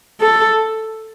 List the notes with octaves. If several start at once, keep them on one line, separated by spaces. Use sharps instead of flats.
A4